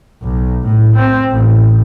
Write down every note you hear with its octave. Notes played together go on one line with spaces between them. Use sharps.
B1
A2
C4
A1